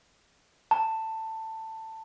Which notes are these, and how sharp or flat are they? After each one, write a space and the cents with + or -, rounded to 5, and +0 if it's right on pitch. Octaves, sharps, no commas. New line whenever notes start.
A5 +15